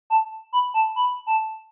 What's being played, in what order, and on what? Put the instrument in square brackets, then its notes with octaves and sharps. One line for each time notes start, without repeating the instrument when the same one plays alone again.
[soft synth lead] A5
B5
A5
B5
A5